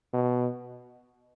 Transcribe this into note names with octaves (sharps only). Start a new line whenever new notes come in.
B2